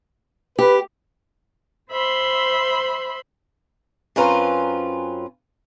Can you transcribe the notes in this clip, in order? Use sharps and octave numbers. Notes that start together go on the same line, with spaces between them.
G4 B4
C5 E5 B5 C6
F#2 C4 C#4 F4 B4 A#5